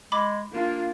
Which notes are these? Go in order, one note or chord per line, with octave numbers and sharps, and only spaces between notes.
G#3 B5 D6
A#3 D4 F4